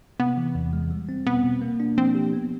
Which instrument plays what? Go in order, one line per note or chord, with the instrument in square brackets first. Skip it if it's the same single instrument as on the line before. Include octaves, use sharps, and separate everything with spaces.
[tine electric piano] C3 [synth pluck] B3
[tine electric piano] E3
E2
G#3
G3
C4
[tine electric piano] B2 [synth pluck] B3
[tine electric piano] B2
A#3
D4
[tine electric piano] F3 [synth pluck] C4
[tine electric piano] G4
B3